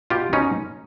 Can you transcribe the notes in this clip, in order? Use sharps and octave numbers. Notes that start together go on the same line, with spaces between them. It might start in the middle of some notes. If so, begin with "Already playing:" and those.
B2 F4 G4
B2 C#4 D#4